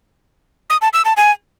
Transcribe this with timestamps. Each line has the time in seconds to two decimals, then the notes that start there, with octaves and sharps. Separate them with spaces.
0.70 D#6
0.82 A5
0.93 E6
1.05 A5
1.17 G#5